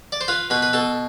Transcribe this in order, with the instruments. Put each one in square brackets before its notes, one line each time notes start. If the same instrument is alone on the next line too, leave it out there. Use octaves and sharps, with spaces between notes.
[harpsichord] D5
C5
F4 B4
B2 B4
B4
B2 A4